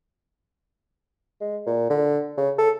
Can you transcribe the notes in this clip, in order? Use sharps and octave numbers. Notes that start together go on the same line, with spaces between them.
G#3
A#2
D3
C#3
A4